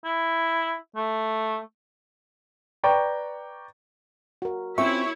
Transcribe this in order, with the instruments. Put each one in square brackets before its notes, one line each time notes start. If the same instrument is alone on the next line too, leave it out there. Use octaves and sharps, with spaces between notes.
[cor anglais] E4
A3
[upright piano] B4 D5 G5 A#5 C#6
[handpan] F#4 A#4
[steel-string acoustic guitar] C4 C#4 F4 [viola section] E4 C#5 [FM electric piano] E5 C#6